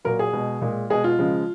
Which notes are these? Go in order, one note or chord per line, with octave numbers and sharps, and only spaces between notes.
A#2 F#3 A#4
G#4
B2 G#3
A#2 G#3
B2 G#3 G#4
F4
C#3 F3 G#3